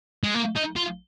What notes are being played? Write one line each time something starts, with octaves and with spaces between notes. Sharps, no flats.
G#3
A#3
D#4
F4